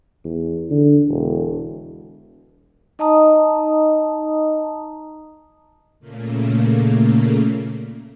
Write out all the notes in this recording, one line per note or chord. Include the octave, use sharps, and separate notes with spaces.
E2
D3
E1
D#4 D#5 A5 A#5 D#6
A#2 C#3 A3 A#3